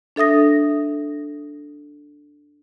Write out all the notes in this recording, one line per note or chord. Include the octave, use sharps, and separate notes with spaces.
D4 A4 E5 D#6 A#6